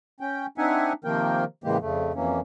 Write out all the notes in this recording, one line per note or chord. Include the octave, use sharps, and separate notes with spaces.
C#4 G5
C4 D4 D#4 E5 F#5 G#5
C3 D#3 F3 A#3 A#4 G5
A2 C#3 E3 G#3 A#3 G4
F2 C#3 A3
F2 E3 F#3 A#3 C#4